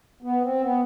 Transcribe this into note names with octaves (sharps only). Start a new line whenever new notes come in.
B3
C4
B3